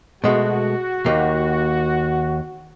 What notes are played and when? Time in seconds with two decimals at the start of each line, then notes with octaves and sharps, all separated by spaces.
0.24 B2 G#3 A3 F#4
1.06 D#2 A#3